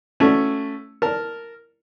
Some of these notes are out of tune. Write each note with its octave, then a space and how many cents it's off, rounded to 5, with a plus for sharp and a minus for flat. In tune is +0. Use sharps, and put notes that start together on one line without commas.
A3 +0 C#4 +0 F#4 +0
A#4 -5 A5 +0